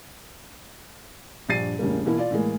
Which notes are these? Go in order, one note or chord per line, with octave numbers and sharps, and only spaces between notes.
A#1 G2 D4 A6 C7 D#7
E1 A2 C#3 G3 A#3
B2 E3 A#3 E4
F4 D5
A2 E3 G#3 A#3